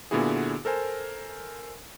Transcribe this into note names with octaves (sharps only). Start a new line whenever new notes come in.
A#2 D3 B3 E4 F#4 G#4
A4 A#4 C5 G#5